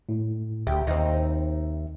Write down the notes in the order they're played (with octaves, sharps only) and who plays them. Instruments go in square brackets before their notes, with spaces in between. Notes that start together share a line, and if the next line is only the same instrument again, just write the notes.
[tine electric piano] A2
[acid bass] D2 [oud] G4 [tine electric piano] E5
[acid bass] D#2 [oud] C4 D#4